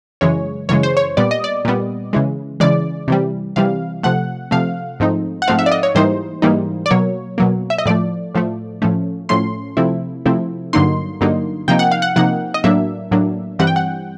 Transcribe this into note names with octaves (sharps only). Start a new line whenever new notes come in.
F#2 C#3 E3 G#3 C#5
F#2 C#3 E3 G#3 C#5
C5
C#5
A#2 G3 B3 D5
D#5
D5
A#2 G3 B3
C#3 E3 G#3
C#3 E3 G#3 D5
C3 E3 G3
C3 E3 G3 F5
C3 F3 A3 F#5
C3 F3 A3 F5
G#2 F3 A3 C4 D#4
F#5
G#2 F3 A3 C4 D#4 F5
E5
D5
D#5
C#5
G#2 E3 G3 A#3 D#4 C5
G#2 E3 G3 A#3 D#4
D5
B2 F#3 A#3 C#5
B2 F#3 A#3
E5
D#5
A2 F3 A3 D5
A2 F3 A3
A2 F3 A3 C#4
A2 F3 A3 C#4 C6
C3 F3 A3 C4 E4
C3 F3 A3 C4 E4
G2 D3 F#3 A#3 D#4 C6
G2 D3 F#3 A#3 D#4
C3 F3 A#3 D#4 G5
F#5
F5
F#5
C3 F3 A#3 D#4 F#5
D#5
A2 F#3 A#3 D4 E5
A2 F#3 A#3 D4
G2 E3 G3 C4 F#5
G5
F#5